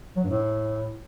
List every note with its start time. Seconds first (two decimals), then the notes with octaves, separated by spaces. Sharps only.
0.16 F#3
0.23 G2
0.31 A2